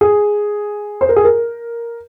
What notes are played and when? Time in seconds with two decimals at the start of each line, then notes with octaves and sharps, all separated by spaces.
0.01 G#4
1.01 C5
1.09 A#4
1.16 G#4
1.24 A#4